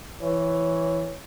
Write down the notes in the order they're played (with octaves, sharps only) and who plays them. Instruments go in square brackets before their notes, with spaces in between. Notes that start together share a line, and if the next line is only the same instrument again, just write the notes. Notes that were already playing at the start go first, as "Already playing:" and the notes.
[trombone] E3 [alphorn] C#5